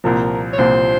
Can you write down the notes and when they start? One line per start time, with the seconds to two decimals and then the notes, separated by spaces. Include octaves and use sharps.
0.04 C2 A#2 F3 A#4
0.53 C#5
0.58 C2 A#2 F3 C5